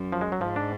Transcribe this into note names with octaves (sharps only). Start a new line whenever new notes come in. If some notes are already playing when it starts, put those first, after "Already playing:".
Already playing: F#2
F3
G#3
F#3
G#2 F3
D4